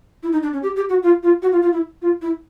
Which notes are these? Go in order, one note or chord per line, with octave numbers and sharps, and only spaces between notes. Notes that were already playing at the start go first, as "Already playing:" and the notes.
E4
D#4
D4
C#4
G4
G4
F#4
F4
F4
F#4
F4
F4
E4
F4
E4